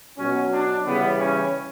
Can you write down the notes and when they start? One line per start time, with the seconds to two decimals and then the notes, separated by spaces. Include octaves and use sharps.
0.18 B2 F#3 C#4
0.52 D4
0.86 C#3 E3 G3 B3
1.19 C#4